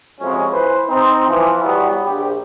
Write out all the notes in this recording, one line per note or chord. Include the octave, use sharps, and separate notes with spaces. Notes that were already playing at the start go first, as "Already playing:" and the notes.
F2 C3 F3 F#3 G#3 C#4
E3 B4 C5
C4 D#4
E3 F3
E3 F#3 G3 B3
A#1 G4